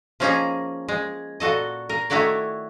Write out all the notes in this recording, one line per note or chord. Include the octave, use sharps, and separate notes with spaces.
F3 A#3 C#4 D#4 G#4 A#5
G#3
A#2 F#4 A4 D#5
A#4
D#3 A3 E4 F#4 C#5 D5